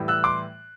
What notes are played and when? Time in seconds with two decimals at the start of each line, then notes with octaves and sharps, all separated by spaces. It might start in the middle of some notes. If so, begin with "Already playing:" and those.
Already playing: A2 E3 G3
0.08 E6 F#6
0.24 C6 D6